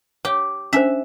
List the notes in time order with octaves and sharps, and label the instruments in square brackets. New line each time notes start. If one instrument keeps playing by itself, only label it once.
[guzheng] G4 [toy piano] C#5
[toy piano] C#4 D4 C5 [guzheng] E5